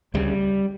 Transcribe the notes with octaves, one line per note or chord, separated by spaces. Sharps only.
D2 C#3 G3